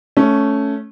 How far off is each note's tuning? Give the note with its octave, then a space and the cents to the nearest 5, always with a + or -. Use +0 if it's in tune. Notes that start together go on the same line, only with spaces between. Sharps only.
A3 -10 C#4 +0